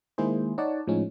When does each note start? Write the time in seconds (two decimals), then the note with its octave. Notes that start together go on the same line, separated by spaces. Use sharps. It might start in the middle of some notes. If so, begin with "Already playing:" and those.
0.18 D#3 G#3 A#3 E4 G#4 C5
0.58 D#4 C#5 D5 F#5 A5
0.87 A2 F3 G#3 C#4 D#4